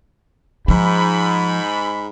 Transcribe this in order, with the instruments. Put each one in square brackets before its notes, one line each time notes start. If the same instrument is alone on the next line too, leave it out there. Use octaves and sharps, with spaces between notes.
[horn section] G#2 B5 [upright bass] F3